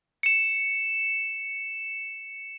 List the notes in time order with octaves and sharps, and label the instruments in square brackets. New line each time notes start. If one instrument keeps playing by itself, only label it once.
[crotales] C#7 E7